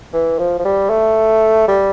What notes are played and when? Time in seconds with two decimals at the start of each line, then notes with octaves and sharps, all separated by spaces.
0.13 E3
0.39 F3
0.59 F3
0.65 G3
0.90 A3
1.68 G3